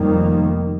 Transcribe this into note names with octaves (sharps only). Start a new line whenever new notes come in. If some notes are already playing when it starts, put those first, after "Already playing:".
Already playing: F1 F2 D#3 G3 A#3